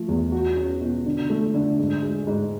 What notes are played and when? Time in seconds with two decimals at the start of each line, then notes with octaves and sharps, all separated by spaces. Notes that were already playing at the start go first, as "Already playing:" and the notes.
Already playing: F3 A3
0.09 E2
0.32 F#4
0.56 C#4
0.81 B2
1.06 D3
1.30 A3
1.54 D3
1.78 G#2
2.02 G#3
2.27 G#2